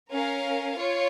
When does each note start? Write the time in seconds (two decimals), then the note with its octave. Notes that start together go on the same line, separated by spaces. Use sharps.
0.11 C#4 A#4 F5
0.77 F4 C#5